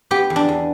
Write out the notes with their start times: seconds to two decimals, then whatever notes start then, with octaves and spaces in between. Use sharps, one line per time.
0.11 B3 G4
0.30 E2
0.36 D4
0.49 E2